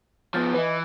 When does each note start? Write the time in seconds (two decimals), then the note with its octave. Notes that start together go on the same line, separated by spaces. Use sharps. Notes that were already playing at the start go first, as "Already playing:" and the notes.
0.34 F3 B3 F6 G6 A6
0.54 E3 B4 D#5